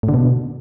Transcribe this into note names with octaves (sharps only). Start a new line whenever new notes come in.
A2
D3
B2